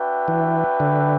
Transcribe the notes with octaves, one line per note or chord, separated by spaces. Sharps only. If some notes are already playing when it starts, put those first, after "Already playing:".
Already playing: D4 F#4 B4 E5 G5
E3
D3